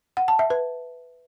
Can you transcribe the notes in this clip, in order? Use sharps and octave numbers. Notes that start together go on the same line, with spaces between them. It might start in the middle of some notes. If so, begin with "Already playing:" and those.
F#5
A5
E5
B4